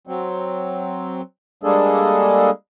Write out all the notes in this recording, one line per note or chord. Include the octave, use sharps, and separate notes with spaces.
F#3 C4
G3 G#3 A#3 D4 G#4 A4